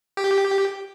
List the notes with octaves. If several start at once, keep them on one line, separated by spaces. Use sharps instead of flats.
G4